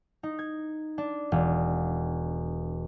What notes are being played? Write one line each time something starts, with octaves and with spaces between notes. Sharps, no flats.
D#4
G#6
D4
E1